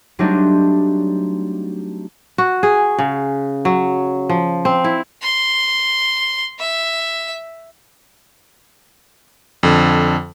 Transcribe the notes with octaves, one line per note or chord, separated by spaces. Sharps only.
F#3 G3 A3 C4 D4 D#4
F#4
G#4
C#3
F#3
F3
C4
E4
C6
E5
F2 D3